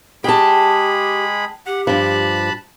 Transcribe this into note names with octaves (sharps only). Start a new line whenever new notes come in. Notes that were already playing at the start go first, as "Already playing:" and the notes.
G#3 G4 G#4 G5 A5 B5
G4 F#5
G2 F3 A5 B5 F#6